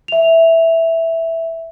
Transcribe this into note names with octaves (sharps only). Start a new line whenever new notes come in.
E5 F7